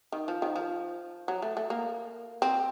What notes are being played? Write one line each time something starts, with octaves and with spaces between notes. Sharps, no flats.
D#3
F3
D#3
F3
F#3
A3
A3
A#3
C4